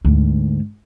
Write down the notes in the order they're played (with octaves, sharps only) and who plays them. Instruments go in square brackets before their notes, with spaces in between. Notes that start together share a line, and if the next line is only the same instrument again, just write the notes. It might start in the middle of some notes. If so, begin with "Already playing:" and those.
[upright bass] D2 G#2